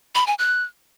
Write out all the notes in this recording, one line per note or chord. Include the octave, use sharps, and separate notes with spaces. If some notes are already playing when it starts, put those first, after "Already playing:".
B5
G#5
F#6